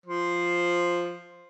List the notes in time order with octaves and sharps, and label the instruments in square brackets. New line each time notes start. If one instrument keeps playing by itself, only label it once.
[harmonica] F3 C5